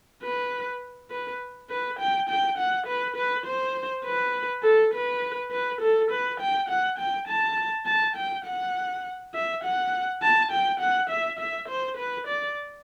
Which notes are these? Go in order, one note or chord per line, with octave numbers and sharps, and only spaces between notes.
B4
B4
B4
G5
G5
F#5
B4
B4
C5
B4
A4
B4
B4
A4
B4
G5
F#5
G5
A5
A5
G5
F#5
E5
F#5
A5
G5
F#5
E5
E5
C5
B4
D5